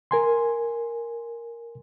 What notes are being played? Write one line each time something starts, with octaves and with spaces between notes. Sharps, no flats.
A#4 G#5 C6